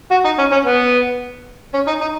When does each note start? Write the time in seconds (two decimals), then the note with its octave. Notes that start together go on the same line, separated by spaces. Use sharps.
0.11 F#4
0.25 D#4
0.39 C#4
0.52 C#4
0.66 B3
1.74 C#4
1.87 D#4
2.01 D#4